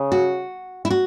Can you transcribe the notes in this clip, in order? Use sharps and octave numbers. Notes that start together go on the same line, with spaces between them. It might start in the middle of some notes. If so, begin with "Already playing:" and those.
Already playing: C#3
F#4
E4
F#4